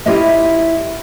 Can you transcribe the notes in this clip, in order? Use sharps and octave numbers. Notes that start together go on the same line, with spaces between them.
E4 F4 G4 C#5 D#5 E5